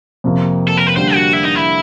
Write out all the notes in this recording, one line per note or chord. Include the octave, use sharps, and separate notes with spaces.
F2 C3 F3 A#3
A4
A#4
B4
D3 G3 A#3 C5
F#4
E4
D#4
E4